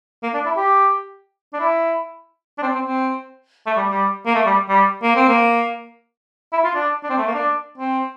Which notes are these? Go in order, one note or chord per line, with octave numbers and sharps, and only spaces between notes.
A#3
D4
E4
G4
D4
E4
D4
C4
C4
C4
A3
G3
G3
A#3
A3
G3
G3
A#3
C4
A#3
E4
F4
D4
D4
C4
A3
A#3
D4
C4